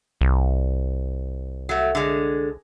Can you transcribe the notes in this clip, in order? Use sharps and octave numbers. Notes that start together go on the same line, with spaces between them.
C2
F#3 A3
D3 G#3